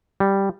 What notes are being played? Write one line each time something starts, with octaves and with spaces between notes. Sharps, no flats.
G3